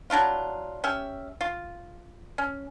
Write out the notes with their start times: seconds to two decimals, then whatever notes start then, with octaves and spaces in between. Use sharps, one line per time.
0.10 F#3 D4 E4 F4
0.84 C#4 G4 E5
1.41 F4
2.38 C#4